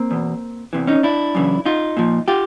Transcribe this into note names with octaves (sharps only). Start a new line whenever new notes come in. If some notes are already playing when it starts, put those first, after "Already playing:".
Already playing: A#3 C4
E2 B2
E2 C3 E3
C#4 D#4
D4 E4
F#2 C#3 E3
D#4 F4
A#2 F3
F4 G4